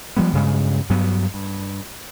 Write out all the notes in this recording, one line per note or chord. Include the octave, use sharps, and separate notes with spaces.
F3 G3 G#3 B3
G2 C#3 G#3
G2 F#3 B3
G2